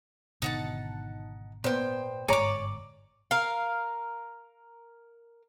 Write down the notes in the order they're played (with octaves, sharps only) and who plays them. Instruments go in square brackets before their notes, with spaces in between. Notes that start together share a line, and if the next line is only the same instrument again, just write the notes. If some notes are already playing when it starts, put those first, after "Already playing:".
[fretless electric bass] G#1 B2 D3 [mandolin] D#4 F#5 A5
[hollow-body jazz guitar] A#2 B3 [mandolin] C5 G5
[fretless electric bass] G1 G#2 [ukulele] C#5 [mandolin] D5 D6 [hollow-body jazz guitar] G#5 A#5
[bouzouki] A#4 F5